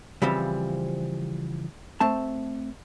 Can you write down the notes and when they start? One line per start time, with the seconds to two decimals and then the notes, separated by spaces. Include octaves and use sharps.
0.22 C#3 E3 F3 G3 C4
2.00 A3 C4 A5